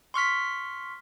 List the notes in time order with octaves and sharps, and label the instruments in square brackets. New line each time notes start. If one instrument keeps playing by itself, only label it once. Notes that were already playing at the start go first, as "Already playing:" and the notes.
[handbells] C6 C#6 F6 B6